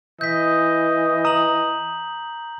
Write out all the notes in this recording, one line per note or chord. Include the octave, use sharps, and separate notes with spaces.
E3 D#5 G6 B6
A#5 D#6 F#7